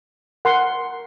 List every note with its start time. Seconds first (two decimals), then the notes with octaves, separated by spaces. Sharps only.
0.45 A#4 F#5 C6